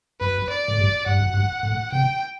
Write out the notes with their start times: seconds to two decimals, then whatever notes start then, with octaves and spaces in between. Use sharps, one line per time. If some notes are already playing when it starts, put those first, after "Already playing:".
0.20 F#2 B4
0.49 D5
0.68 A2
0.78 G2
1.06 G2 F#5
1.21 F#2
1.34 G2
1.63 A2
1.92 C3 G5